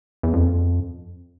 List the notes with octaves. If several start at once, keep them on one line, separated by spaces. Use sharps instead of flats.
E2
F2